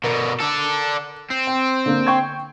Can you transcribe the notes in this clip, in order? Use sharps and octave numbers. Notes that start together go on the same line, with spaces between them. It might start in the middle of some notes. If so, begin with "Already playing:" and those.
B2 D3 A#4
D4 A4
C4
G5
D3 A#3
G5 C#6 G#6